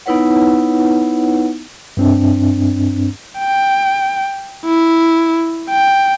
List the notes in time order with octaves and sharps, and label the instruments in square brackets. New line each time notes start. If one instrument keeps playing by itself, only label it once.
[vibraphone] B3 D#4 E4 B4 C#5 F#5
[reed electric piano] G2 C4 D4
[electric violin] G5
E4
G5